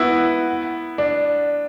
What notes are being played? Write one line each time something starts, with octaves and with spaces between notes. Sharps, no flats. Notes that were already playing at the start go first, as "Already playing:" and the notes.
Already playing: B3 E4 F#4
D4